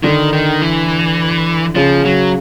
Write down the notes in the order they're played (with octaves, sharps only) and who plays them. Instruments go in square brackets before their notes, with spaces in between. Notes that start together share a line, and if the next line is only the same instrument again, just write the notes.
[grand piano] D3 [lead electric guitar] D#3
[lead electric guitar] D#3
E3
[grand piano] C#3 [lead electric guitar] F3
[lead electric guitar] F#3